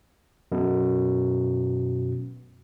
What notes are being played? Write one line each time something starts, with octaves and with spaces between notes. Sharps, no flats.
F#2 B2